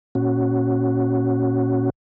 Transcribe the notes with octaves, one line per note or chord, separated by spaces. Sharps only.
A#2 C#4 F#4